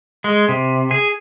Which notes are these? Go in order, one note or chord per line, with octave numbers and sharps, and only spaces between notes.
G#3
C3
G#4